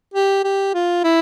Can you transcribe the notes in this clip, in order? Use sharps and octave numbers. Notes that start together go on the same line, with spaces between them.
G4
G4
F4
E4